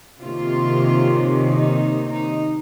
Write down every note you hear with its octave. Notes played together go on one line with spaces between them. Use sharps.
C3 D#3 A#3 C#4 F4
D#4
D#4